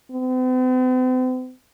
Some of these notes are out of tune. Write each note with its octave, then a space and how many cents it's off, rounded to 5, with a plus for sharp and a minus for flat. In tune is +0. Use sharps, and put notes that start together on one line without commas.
C4 -45